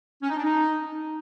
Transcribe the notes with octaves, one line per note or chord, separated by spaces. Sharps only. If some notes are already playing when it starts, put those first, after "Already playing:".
C#4
D#4
D4
D#4